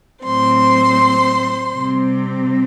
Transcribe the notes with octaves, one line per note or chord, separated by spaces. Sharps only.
A2 F#3 C4 C5 C6
C3 G3 C4